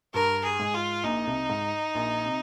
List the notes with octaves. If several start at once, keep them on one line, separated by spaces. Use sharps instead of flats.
G2 A#4
G#4
G#2
F4
A#1 A#2 D#4
C2 C3
G#2
A#1 A#2
C3